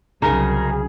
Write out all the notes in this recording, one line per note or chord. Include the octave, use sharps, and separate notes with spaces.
C2 C#3 F#3 D#4 G#4 A#4